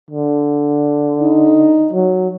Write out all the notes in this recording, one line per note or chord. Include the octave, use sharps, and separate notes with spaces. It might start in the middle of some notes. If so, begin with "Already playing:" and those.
D3
D#4
F#3